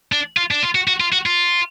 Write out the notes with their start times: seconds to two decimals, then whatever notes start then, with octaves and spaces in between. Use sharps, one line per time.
0.12 D4
0.37 F4
0.51 D4
0.63 F4
0.75 F#4
0.88 F#4
1.00 F4
1.13 F#4
1.26 F4